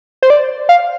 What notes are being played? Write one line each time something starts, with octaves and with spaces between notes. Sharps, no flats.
C5
D5
F5